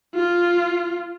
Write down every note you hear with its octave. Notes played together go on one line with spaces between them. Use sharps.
F4